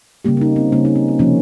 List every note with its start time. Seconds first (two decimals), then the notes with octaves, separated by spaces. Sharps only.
0.25 C#3 G3 A#3 G4
0.37 C#4
0.41 D#4
0.56 C4
0.72 C#3 G3 A#3 C#4
0.85 D#4
0.96 C4
1.08 C4
1.19 C3 F3 A#3 C#4